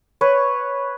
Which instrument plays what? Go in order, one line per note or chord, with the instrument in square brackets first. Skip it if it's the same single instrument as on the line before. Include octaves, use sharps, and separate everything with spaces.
[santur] B4 C#5